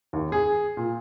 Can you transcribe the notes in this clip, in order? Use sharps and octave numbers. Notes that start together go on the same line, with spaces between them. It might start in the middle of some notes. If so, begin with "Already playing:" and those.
D#2
G#4
A#2